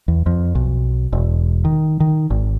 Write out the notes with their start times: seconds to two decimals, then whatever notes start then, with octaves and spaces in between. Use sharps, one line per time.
0.08 E2
0.26 F2
0.55 B1
1.13 E1
1.65 D#3
2.00 D#3
2.30 G#1